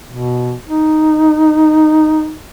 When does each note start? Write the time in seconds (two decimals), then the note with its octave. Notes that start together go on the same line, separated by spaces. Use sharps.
0.09 B2
0.68 D#4